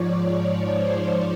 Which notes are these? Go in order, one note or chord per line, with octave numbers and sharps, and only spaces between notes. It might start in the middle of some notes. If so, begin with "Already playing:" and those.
Already playing: G#2 F3 C#5 D5
C#5
C5